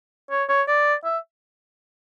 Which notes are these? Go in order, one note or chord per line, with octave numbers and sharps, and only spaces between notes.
C#5
C#5
D5
E5